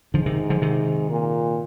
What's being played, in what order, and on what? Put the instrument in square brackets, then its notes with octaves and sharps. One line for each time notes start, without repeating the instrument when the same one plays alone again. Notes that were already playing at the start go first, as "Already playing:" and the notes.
[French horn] G#2 [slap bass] D3 F3
[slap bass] C3 D#3
D3 F3
C3 D#3
[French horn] A#2